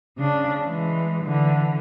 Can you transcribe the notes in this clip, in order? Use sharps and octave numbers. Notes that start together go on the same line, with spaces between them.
C#3 D4
E3 G#3
D3 E3